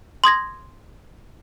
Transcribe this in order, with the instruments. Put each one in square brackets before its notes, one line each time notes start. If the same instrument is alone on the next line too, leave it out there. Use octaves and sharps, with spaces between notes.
[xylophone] C6 D#6 G#6 A#6